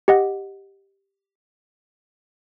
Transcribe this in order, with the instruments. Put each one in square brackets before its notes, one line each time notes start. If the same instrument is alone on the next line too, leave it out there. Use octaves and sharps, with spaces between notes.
[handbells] G4 D#5 F#5